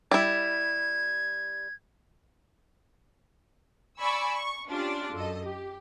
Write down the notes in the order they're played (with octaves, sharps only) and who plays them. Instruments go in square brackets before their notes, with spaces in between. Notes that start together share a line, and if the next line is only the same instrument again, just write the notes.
[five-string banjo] G3 E4 [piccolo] G#6
[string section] D5 G#5 B5 C#6 E6
C#6
C#4 D4 F4 G4 D5
F#2 A4 D#5
G4